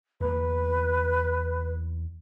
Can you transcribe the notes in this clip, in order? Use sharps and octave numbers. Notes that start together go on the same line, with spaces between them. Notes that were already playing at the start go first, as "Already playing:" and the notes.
E2 A#3 B4